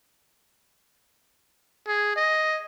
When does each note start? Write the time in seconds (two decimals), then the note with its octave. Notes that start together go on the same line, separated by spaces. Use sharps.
1.87 G#4
2.16 D#5